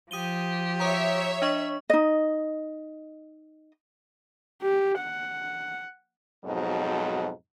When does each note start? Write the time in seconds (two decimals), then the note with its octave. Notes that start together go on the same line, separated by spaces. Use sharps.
0.11 F3 G4 D#6 D#7 G7
0.80 C#5 E5 A#5 D#6
1.42 D4 D#5 C#6
1.90 D#4 D#5
4.63 G4
4.98 F#5
6.45 F2 G#2 B2 F#3 D#4